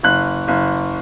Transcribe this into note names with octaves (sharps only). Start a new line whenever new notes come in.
F#1 F#6
F#1